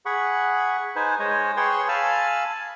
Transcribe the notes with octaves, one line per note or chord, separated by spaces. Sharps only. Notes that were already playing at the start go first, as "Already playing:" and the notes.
G#4 F#5 B5 C#6
D#4 B4 C5 G#5
G#3 C5 C#5 D#5
G#4 B4 C#5 G5 C6 C#6
F5 G#5 A5 B5 E6 F6